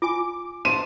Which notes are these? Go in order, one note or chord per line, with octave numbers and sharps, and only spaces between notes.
F4 G#5 D6
C5 A5 D#7